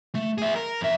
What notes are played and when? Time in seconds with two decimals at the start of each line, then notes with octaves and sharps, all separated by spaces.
0.15 A3
0.38 G#4 E5
0.56 A#4
0.81 F2 E5